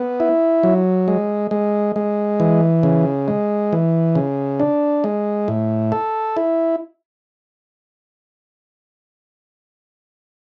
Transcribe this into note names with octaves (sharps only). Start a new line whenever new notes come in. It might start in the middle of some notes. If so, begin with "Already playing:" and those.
Already playing: B3
E4
F#3
G#3
G#3
G#3
E3
C#3
G#3
E3
C#3
D4
G#3
A2
A4
E4